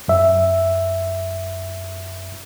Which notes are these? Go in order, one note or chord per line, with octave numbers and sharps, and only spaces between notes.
F#2 E5